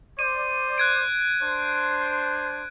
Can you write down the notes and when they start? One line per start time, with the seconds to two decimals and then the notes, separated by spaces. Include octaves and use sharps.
0.19 C5 D5 D#7
0.78 F#6 G#6 D7
1.42 D4 C5